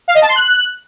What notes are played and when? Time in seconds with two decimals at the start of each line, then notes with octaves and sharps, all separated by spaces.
0.08 F5
0.15 D#5
0.22 A5
0.29 C6
0.36 F#6